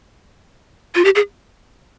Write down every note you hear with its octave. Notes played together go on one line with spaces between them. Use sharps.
F4
G4
G#4